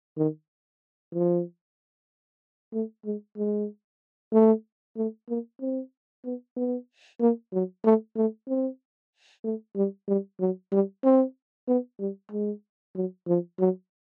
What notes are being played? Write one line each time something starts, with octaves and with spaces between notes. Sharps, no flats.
D#3
F3
A3
G#3
G#3
A3
A3
A#3
C4
B3
B3
A#3
F#3
A3
A3
C4
A3
G3
G3
F#3
G3
C4
B3
G3
G#3
F#3
F3
F#3